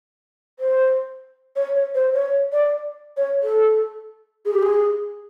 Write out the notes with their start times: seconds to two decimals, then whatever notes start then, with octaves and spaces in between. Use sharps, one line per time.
0.59 C5
1.56 C#5
1.75 C#5
1.95 C5
2.14 C#5
2.52 D5
3.17 C#5
3.43 A4
4.45 G#4
4.53 G4
4.63 G#4